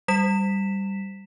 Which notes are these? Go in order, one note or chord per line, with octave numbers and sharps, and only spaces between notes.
G3 B6 E7